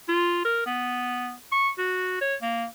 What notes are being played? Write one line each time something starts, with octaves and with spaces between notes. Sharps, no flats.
F4
A#4
B3
C#6
F#4
C#5
A#3